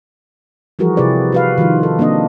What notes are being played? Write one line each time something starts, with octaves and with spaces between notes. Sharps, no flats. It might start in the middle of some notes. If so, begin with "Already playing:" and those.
E3 F3 G3 F#4 G#4 A#4
C3 E4 G4 G#4 B4 D5
F#4 B4 F5
D#3 F3 G3 F4
A4
A#3 C4 D4 D#5